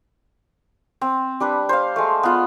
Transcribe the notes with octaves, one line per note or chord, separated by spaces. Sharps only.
C4
G3 D4 B4
C5 F5
G#3 A3
B3 F4